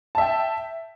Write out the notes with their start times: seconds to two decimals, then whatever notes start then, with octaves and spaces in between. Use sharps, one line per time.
0.15 A5
0.18 E5
0.21 G5